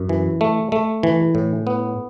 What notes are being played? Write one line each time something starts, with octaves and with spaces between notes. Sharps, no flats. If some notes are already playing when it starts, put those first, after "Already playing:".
Already playing: F#2
E3
A3
A3
E3
A2
B3